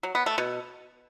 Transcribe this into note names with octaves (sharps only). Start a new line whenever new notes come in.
F#3
B3
A3
B2